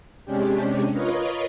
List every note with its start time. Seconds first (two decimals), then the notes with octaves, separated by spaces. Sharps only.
0.25 C3 G#3 C#4 D4 G4
0.91 F4 A#4 B4 C#5 D#5